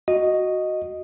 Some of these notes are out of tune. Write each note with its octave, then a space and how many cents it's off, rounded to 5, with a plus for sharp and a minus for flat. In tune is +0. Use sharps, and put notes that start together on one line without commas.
F#4 +0 D#5 +0